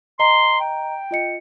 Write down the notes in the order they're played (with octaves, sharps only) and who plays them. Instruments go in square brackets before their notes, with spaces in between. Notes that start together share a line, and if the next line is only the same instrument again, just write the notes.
[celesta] D#5 A#5 [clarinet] C6
[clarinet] G5
[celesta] F4 D#5 C#7